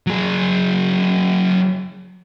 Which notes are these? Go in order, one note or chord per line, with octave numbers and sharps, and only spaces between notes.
F#3 G#4